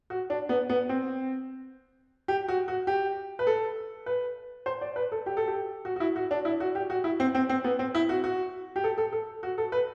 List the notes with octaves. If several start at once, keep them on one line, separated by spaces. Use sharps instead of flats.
F#4
D4
B3
B3
C4
G4
F#4
F#4
G4
B4
A4
B4
C5
D5
B4
A4
G4
A4
G4
F#4
F#4
E4
F#4
D4
E4
F#4
G4
F#4
E4
C4
C4
C4
B3
C4
E4
F#4
F#4
G4
A4
A4
A4
F#4
A4
B4